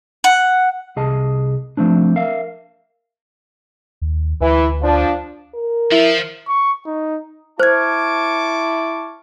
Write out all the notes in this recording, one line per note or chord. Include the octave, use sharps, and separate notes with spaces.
F#5
C2 G#4 D#5 A5
F3 A3 C4 D4
A#4 E5 F5
D#2
D2 E3
F3 D4
A#4
F3 E4
C#6
D#4
E4 C5 A5 C#6 D6 F6 G#6